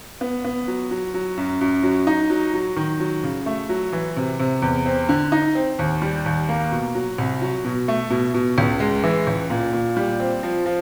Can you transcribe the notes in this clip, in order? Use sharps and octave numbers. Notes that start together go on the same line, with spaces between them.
B3
B3
F#3
F#3
F#3
F#2
F#2
F#3
D#4
F#3
F#3
D#3
F#3
C#3
A3
F#3
E3
C3
C3
E2
C4
D3
D#4
C4
D#2
G3
D#2
A#3
B2
F#3
C2
F#3
B2
A3
B2
B2
C#2
G#3
E3
C#2
A#2
A#2
G3
C4
F3
F3